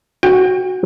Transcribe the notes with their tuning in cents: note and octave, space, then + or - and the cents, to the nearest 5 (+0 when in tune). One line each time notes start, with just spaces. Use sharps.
F#4 +0 G5 +30